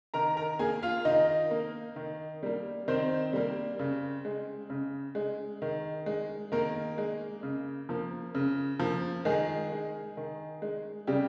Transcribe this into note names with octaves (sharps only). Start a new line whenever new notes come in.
D#3 A#4 A#5
A#4 A#5
A#3 G#4 G#5
F4 F5
D#3 D#4 D#5
A#3
D#3
G3 A#3
D#3 C4 C5
G3 A#3
C#3
G#3
C#3
G#3
D#3
G#3
D#3 A#3 A#4
G#3
C#3
F3 A#3
C#3
F3 A#3
D#3 G#3 G#4
G#3
D#3
G#3
C#3 G3 G4